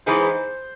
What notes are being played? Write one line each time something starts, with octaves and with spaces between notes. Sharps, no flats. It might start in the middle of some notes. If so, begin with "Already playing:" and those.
E3 G#3 B3 D#4 G#4 C5